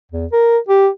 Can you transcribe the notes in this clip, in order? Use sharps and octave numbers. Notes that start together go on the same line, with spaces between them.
E2
A#4
G4